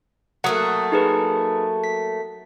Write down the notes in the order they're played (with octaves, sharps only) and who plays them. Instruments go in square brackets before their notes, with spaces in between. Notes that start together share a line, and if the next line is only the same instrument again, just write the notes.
[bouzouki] F#3 A3 A#3 [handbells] F#5 D#6
[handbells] D#4 G#4 B4
B6